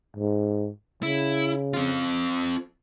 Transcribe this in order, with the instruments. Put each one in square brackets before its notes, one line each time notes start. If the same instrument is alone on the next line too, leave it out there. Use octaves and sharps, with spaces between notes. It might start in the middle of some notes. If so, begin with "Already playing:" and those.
[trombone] G#2
[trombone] C#3 [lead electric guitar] E4
[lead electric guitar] C4 F4